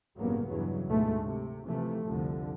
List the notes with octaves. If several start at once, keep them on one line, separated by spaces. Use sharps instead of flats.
A1 G2 C#3 F#3 A#3 B3
E2 G2 C#3 E3 F#3
D2 G#2 B2 G#3 A3
C3
C3 E3 F3 A3
C2 F2 D3 F3